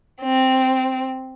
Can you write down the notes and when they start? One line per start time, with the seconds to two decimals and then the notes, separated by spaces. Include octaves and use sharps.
0.22 C4